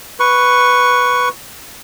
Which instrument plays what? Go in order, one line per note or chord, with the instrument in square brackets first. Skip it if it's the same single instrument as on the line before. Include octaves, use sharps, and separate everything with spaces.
[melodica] B4 C#6